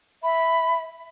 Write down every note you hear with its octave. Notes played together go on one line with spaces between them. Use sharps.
E5 B5